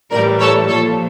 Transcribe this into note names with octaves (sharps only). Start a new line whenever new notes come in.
A2 E3 G3 A#4 D5
A4 C#5
A#2 F3 A4 C#5